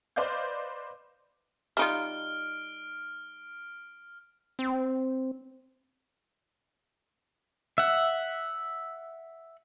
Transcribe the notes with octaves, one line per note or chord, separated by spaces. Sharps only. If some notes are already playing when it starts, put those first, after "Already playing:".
B4 C5 D5 D#5 F5 G6
G3 D#4 F4 F6 D7
C4
E5 F#5